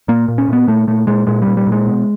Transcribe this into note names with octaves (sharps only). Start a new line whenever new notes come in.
A#2 A#3
A#2
C#4
A#2 B3
A#2 A3
A#2 A3
A#2 G#3
A#2 G#3
A#2 G3
G3
A#2
G#3
B2